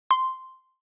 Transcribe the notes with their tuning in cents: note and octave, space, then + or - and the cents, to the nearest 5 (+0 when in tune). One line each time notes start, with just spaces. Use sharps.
C6 -5